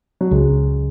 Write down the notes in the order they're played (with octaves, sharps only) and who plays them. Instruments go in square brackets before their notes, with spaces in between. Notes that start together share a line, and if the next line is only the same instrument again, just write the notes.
[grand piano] F#3
[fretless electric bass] C#2 [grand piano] G#3